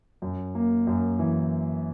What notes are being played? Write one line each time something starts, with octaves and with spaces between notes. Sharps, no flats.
F#2
A#3
F#2
E3